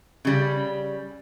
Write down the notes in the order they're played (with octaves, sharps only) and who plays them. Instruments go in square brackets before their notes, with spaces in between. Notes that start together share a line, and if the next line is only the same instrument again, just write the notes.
[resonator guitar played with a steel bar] C#3 G3